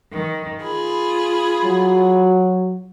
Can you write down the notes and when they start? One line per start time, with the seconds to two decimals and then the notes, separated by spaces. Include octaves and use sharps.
0.11 D#3
0.62 F4 G#4 B5
1.65 F#3